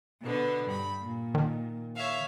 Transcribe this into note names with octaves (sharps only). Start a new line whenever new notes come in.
B2 D3 B3
G2 B5
A#2
D#3
C#5 E5 F5